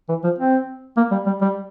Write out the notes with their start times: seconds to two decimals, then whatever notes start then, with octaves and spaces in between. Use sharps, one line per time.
0.09 E3
0.24 F3
0.39 C4
0.97 A#3
1.11 G3
1.26 G3
1.41 G3